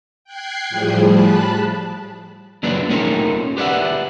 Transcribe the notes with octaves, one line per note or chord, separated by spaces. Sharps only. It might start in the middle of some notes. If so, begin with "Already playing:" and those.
G5 F#6 G#6 C7
A2 F3 G3 G#4
A5 B5 F#6
F#3 A#3 D4 B4 D5
A3 A#3 C#4 D#4 F4 A#4
G4 B4 D5 E5 F#5